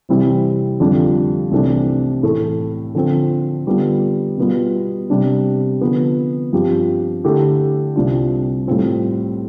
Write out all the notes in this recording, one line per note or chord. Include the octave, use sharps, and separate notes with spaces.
C3 E3 G3 C4 E4
F2 D3 G3 D4 F4
C2 C3 E3 A3 D4
A2 E3 A3
D3 F3 C4
D3 G3 B3 D4 F4
B2 G3 B3 F4
C3 G3 D4
D3 F3 B3
G2 F3 C4 G4
D3 A3 E4 G4
C2 C3 G3 D4 F4
A2 G3 C4 F4